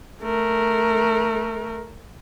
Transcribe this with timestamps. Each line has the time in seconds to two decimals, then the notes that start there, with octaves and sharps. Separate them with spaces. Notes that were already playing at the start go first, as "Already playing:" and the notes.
0.22 A3 A#4